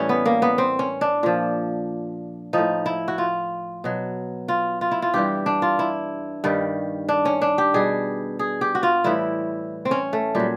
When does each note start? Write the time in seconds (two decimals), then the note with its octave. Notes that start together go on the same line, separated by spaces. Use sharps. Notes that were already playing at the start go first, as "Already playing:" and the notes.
Already playing: A2 E3 G3 C#4
0.09 B3
0.26 A#3
0.42 B3
0.58 C4
0.79 C#4
1.01 D4
1.23 A#2 F3
2.53 A2 F3 D#4
2.86 E4
3.08 F#4
3.18 F4
3.84 B2 F#3
4.48 F4
4.81 F4
4.91 E4
5.02 F4
5.14 G2 E3 G3 G4
5.46 D4
5.62 F4
5.79 E4
6.44 G2 D#3 G3
7.09 D4
7.25 C#4
7.42 D4
7.58 G4
7.74 B2 G3 G#4
8.39 G#4
8.61 G4
8.75 F#4
8.83 F4
9.04 A2 E3 G3 E4
9.85 C4
9.91 C#4
10.13 A3
10.35 A#2 F#3 G3